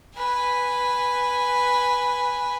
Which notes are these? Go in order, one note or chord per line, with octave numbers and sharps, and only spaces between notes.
B4 G#5